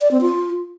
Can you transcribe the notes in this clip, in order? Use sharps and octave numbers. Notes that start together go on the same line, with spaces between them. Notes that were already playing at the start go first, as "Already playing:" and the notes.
D5
C4
F4